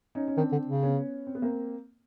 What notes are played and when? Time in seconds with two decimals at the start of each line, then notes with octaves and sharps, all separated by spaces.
0.15 C#4 D#4
0.28 C#4
0.37 D#3 C4 D4
0.52 D3
0.67 C#3
0.83 B3 C#4
1.27 C4
1.35 B3
1.42 A#3 C4